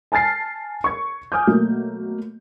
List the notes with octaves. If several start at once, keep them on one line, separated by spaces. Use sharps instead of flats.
G#5 A5 F6 A6 C7
C#6 G#6
G#5 D6 D#6 F6 G6
B2 F#3 A3 A#3